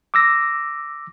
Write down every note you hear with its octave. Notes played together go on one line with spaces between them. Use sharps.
D6 E6 A#6